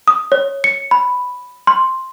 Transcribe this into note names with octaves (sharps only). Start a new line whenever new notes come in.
D#6
C#5
C#7
B5
C6